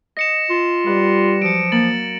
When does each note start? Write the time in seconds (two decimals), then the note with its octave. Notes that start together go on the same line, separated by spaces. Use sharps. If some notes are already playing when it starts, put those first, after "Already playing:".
0.17 D#5 A#6 C#7 E7
0.50 F4
0.86 G3 B4 D5 F#5
1.42 F3 F#3 C#7 D7
1.72 A#3 A6 F#7